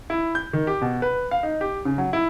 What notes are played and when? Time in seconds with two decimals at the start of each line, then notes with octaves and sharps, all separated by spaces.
0.10 E4
0.35 G6
0.53 D#3
0.67 G4
0.82 B2
1.02 B4
1.31 F5
1.43 D#4
1.61 G4
1.85 C#3
1.98 F#3
2.13 E4